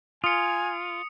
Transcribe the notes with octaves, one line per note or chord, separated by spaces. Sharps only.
F4 G#5 D#6 C#7